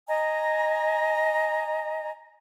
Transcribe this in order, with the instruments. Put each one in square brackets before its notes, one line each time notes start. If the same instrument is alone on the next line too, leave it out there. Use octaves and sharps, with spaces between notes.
[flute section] D#5 G#5 A#5